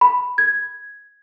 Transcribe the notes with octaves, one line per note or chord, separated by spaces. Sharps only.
B5
G#6